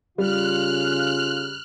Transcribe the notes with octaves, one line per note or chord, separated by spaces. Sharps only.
C#3 G3 F4 F6 F#6